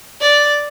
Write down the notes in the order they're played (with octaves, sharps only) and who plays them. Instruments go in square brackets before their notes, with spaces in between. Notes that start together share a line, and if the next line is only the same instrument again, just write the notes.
[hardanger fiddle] D5